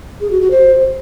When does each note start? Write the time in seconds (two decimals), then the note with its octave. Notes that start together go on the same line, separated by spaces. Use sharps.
0.21 G#4
0.31 F#4
0.41 F#4
0.51 C5